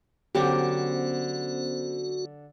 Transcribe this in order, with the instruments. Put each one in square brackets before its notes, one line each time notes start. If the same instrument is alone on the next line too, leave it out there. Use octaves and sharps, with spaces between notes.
[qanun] D3 F#3 D4 [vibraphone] B3 C#4 C5 [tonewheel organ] F#4 [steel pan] G4